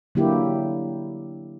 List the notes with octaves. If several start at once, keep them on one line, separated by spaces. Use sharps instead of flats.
D3 F#3 A#3 E4 G4